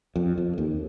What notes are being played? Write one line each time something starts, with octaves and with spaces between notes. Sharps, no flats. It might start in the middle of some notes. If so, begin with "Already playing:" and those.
F2
F2
D#2